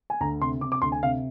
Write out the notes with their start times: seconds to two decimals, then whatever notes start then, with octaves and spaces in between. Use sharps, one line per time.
0.10 G#5
0.21 D2 A#5
0.41 C3 C6
0.61 C3 D6
0.72 D6
0.82 D2 C6
0.92 G#5
1.02 C3 F5